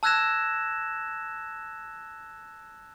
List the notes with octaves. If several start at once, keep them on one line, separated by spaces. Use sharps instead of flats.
A5 E6 F#6 G#6 A#6 E7